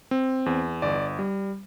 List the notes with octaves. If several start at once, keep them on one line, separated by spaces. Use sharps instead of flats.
C4
E2
G1 D5
G3